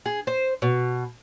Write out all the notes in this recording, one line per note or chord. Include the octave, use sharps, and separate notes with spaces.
G#4
C5
B2